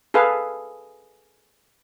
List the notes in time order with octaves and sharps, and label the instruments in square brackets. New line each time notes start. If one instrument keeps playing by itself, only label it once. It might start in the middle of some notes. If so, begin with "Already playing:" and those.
[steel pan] G#4 A4 B4 F5